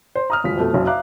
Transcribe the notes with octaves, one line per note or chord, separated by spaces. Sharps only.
C5
A#5 D#6 F6
D#1 C#2 F#2 B6
F2 B2 A3
F#1 B1 F#2 C#3 F#3
E5 F5 A#5 D6 F#6